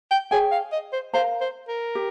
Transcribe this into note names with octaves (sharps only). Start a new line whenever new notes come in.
G5
G#4 C#5 G5 G#5
F5
D#5
C5
A#4 C5 F5 A#5
C5
A#4
G4